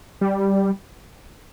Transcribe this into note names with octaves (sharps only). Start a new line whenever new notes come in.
G3